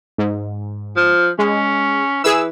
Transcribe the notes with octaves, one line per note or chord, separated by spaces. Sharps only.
G#2
F3
G#3 C#4
E3 G#4 E6